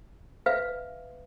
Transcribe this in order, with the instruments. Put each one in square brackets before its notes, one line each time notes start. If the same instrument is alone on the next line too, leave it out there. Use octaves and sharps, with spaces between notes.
[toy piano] B4 E5 F5